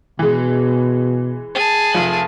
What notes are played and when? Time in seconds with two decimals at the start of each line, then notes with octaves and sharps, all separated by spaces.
0.19 B2 E3 G#3
1.55 G#4 A5
1.93 F1 F3 F#7